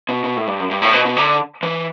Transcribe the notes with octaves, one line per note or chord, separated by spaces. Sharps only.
B2
B2
A2
G2
F#2
G2
A2
B2
B2
D3
E3